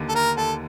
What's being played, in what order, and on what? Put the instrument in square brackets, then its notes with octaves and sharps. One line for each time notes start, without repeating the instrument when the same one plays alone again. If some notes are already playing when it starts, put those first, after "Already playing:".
Already playing: [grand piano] D#2 D3
[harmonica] A4
[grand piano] D#2 [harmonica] A#4
[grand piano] D#2 [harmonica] A4